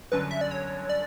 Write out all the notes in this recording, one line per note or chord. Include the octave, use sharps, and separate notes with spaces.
G1 F#2 D3 B4
E5
D5
C#5
D5